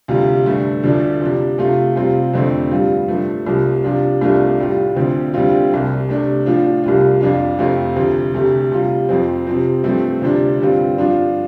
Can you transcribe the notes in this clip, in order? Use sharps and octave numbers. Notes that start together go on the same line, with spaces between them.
D2 C3 G3 F4
G2 D3 A3
D2 D3 F3 A3 D4
C3 F3 D4
C3 A3 F4
C3 G3 C4 F4
F2 D3 F3 A3 C4
G2 G3 F4
G2 F3 A3
C2 C3 F3
C3 F3 D4 F4
C2 C3 A3 D4 F4
A2 G3 F4
D2 D3 F3 C4
D2 D3 G3 C4 F4
C2 C3 G3
C3 A3 D4
A2 F3 D4 F4
C2 C3 G3 F4
F2 F3 D4 F4
F2 C3 A3 C4 F4
D2 C3 F3
D2 C3 A3
C3 G3 F4
F2 F3 C4
C3 F3 C4
G2 F3 A3 C4
D2 C3 F3 D4
G2 D3 G3 C4 F4
G2 F3 D4 F4